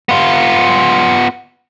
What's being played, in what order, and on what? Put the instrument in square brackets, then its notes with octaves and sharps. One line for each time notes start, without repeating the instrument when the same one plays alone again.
[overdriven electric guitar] B3 F4